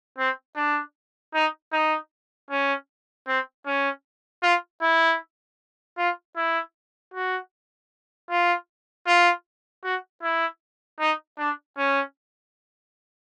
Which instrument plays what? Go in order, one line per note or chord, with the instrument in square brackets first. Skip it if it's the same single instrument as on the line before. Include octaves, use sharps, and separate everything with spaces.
[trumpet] C4
D4
D#4
D#4
C#4
C4
C#4
F4
E4
F4
E4
F#4
F4
F4
F#4
E4
D#4
D4
C#4